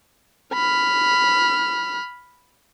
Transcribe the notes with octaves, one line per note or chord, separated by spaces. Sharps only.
B5 F6